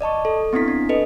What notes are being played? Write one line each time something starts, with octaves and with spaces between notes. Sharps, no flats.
D5 D#5 A5 C#6
A4
B3 C4 D4 E4 B6
D4
A4 B4 D#5